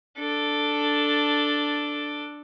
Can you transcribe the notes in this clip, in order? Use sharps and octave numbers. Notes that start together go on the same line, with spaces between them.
D4 A4